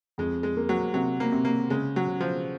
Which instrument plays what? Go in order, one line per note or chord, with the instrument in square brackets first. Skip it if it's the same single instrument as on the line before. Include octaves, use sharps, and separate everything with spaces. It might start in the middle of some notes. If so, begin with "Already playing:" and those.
[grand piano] F2 [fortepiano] G#3
[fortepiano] G#3
[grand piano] A#3
[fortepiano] F#3
[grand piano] C3 [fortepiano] F#3
[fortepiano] A#3
[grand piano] C3
[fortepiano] A#3
[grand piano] C#3 [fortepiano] G#3
[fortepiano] F#3
[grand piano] C#3
[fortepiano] F3